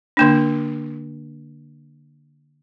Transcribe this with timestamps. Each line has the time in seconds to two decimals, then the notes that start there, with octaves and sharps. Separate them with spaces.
0.17 D3 A#3 D4